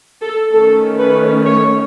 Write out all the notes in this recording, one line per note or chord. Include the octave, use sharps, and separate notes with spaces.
A4
D#3 A3 C#4 A4
B4
C#5